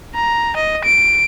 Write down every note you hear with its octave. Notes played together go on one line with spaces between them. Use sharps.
A#5
D#5
D7